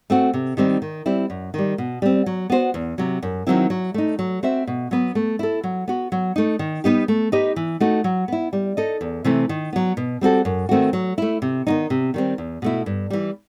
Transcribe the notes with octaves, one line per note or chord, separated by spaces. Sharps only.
A3 C4 F#4
C3
D#3 G3 C4 D#4
D#3
G3 C4 E4
F#2
D#3 G3
B2
G3 C4
F#3
B3 F#4 C5
E2
C3 F#3
F#2
D#3 F#3 C4 E4
F#3
A3 D#4
F#3
C4 F#4 C5 E5
B2
F#3 B3
A3
E4 A4
F#3
B3 F#4
F#3
A3 D#4
D#3
G3 B3 D#4 G4
A3
D#4 G4 B4 D#5
E3
A3 D#4 F#4
F#3
B3 E4
G3
D#4 A4 D#5
E2
C3 E3 A3 C4
D#3
F#3 B3
B2
G3 C4 F#4 A4
F#2
D#3 A3 C4 F#4
F#3
A3 E4
C3
D#3 F#3 B3 D#4
C3
D#3 G3 C4
E2
B2 A3 E4
G2
E3 G3